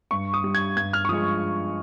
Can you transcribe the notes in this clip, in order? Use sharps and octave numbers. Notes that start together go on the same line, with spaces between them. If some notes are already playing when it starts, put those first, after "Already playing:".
G2 C#6
D#6
G3
G#6
G2 G#6
F6
C#6
F3 G#3 D#6